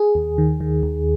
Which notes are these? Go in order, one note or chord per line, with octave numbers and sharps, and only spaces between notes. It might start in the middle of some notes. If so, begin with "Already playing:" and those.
Already playing: G#4
D#2
D#3
D#3
D#2